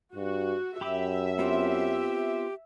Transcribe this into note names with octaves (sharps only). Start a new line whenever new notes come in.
G2 F#4
F#2 G4 E5 B5 D6
B3 C4 F4 G4